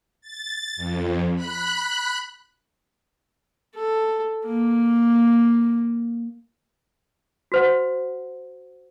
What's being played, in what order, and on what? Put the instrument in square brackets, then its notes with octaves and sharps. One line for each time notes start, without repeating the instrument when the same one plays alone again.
[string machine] A6
F2
B5 F#6
[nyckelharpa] A4
A#3
[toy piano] F#4 C5 F#5